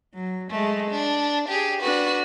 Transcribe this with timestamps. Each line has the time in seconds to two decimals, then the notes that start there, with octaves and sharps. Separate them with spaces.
0.14 F#3
0.50 G#3 A3
0.91 D4
1.49 G4 G#4
1.81 D4 F#4 B4